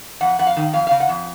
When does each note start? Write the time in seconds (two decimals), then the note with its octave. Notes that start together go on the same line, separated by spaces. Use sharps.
0.21 F2 F#5
0.39 F2 F#5
0.47 F5
0.57 D#3
0.73 F2 F5
0.87 C#3 F5
1.00 F#5
1.09 F2